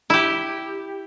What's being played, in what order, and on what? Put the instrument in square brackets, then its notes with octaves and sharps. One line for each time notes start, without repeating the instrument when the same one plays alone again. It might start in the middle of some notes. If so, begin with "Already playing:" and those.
[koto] E4 G4